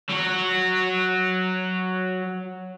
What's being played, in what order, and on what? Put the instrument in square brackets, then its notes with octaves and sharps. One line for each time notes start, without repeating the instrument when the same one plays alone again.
[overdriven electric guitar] F#3 F#4